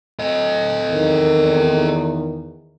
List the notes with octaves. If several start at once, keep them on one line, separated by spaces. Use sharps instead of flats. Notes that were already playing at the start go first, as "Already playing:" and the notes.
A4 D#5
E2 D#3